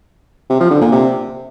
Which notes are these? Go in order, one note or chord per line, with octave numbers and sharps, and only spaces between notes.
C3
F3
D3
A#2
C3